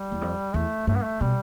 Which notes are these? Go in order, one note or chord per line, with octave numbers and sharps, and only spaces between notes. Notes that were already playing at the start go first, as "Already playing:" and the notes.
Already playing: G3
E2
F2
E2 A3
G2 A3
B3
A3
B2 G3